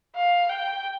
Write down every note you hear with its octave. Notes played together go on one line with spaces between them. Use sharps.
F5
G5